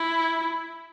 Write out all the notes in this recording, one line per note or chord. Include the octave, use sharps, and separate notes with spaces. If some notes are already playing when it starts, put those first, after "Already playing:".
Already playing: E4